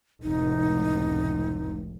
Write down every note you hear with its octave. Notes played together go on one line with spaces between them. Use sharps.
F1 C#2 A2 D#4